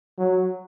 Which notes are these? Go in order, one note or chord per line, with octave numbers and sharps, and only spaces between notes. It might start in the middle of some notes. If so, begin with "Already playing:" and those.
F#3